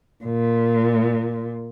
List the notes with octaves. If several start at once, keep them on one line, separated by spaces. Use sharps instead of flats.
A#2